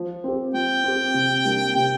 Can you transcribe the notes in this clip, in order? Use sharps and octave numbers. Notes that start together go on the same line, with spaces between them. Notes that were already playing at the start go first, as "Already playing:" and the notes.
Already playing: F3
C4 G4
F3 G5
C4 G4
C3
G3 A#3 D4
C3 G5